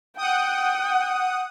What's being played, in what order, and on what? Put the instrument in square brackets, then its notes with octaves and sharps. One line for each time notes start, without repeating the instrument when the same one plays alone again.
[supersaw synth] F#5 D#6 [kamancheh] G5